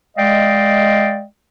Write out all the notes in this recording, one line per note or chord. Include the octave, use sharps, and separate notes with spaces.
G#3 D5 D#5 F5 G5